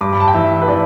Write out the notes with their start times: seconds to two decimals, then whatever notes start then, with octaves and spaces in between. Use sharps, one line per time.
0.01 G2 D6
0.13 B5
0.20 A5
0.28 G5
0.34 E3 E5
0.62 B4
0.68 E3 D5